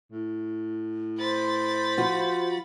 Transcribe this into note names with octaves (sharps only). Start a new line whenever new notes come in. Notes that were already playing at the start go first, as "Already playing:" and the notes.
A2
C5 B5 A6
F3 F4 F#4